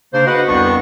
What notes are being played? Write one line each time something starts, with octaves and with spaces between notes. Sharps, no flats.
C#3 A#3 D4 C5
F#4 B4 D#5 F#5
C2 F2 B3 D4 B4 C#6